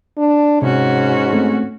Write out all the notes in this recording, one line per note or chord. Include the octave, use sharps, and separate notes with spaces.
D4
G#2 C3 C#4 F#4
A3 C4